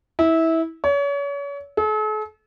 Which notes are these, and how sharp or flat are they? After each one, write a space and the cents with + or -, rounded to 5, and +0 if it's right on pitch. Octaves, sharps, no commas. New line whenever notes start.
E4 -20
C#5 +35
A4 -45